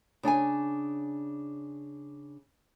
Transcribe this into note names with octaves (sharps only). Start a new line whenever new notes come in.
C#3 D4 G5 G#5